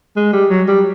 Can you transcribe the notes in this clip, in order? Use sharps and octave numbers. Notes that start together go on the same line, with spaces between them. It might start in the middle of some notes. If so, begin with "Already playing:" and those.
G#3
G3
F#3
G3